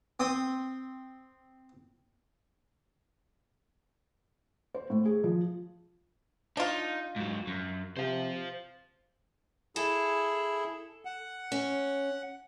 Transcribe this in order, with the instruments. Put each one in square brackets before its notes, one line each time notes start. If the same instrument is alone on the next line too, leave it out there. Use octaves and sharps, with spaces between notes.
[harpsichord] C4 D#6
[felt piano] C5
A2
G#4
F3
[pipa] D4 F4 [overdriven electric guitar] D#4
[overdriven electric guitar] G#2 F#3
F#2
[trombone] C3 [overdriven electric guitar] C5 F5
[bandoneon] E4 G#4 [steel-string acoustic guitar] A4
[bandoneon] F#5
[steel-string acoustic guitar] C#4